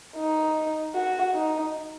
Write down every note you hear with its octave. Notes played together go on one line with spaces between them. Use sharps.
D#4
F#4
D#4